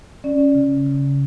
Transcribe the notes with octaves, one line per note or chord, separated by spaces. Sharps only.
C#4 D5
C#3
C#3